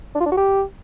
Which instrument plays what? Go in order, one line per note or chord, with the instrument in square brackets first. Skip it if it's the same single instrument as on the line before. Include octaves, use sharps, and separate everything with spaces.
[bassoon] D4
F4
D4
F#4
G4